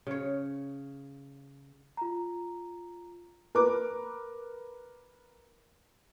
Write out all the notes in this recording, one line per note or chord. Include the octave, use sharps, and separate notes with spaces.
C#3 C#5
F4 A#5
A#4 B4 D6